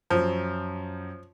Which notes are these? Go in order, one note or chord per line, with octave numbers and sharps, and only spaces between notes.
F#2 F3